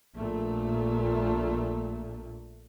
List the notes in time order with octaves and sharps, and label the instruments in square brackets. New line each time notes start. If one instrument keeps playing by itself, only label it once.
[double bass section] A#1 A#2 A3